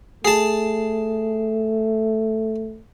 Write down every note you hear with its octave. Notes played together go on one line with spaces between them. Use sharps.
A3 G#4 A5